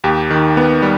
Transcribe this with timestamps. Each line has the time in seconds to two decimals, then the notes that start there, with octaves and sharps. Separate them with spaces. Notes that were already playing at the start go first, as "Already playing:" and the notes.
0.04 D#2 G4
0.30 D#3
0.57 B3
0.82 G3